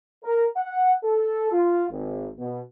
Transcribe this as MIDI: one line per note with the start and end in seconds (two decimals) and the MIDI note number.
0.24 0.46 70
0.57 0.93 78
1.04 1.52 69
1.52 1.85 65
1.90 2.29 32
2.39 2.61 47